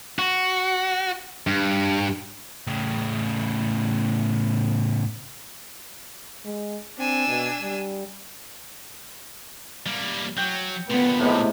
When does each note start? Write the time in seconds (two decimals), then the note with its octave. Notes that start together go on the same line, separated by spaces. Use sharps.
0.19 F#4
1.47 G2
2.67 A2 C#3
6.45 G#3
6.98 C4 D4 G#5 E6
7.27 B2
7.62 G3
9.86 G3 A#3
10.37 F#3 G5
10.90 D2 A#2 B3
11.20 A2 C3 G#3